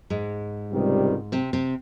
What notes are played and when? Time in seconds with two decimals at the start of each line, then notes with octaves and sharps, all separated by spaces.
0.10 G#2 G#3
0.71 C#2 C3 D#3 G3
1.32 C3 C4
1.53 C3 C4